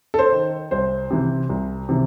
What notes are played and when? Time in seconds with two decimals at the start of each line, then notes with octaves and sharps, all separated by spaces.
0.14 A4
0.19 C5
0.32 D#3
0.71 C2 C5
1.11 C3 E3
1.49 C2
1.89 C3 E3